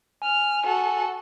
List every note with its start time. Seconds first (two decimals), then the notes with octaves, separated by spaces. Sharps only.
0.22 G#5 F6
0.65 F#4 A4